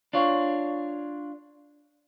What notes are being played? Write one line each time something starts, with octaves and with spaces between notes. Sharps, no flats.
D4 F4 C#5